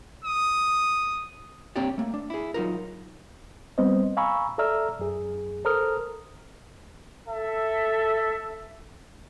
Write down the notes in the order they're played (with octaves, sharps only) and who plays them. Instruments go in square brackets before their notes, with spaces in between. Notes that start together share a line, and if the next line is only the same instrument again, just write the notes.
[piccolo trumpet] D#6
[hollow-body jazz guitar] A#3 C4 D4 G4 C#5 D5
A3 A#3
D4
E4 G#4
F#3 D#4 F4 A#4
[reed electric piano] G3 B3 C4 C5 D#5
F5 G#5 A#5 B5 C#6 E6
A4 D5 E5 A#5 E6 F6
F#2 G#4
A4 A#4 C5 A#5 D#6 F6
[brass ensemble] A4 E5